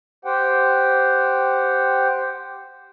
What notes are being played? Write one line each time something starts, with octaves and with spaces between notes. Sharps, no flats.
G4 C5 F#5 G5